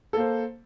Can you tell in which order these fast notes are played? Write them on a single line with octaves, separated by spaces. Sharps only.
A4 A#3 C5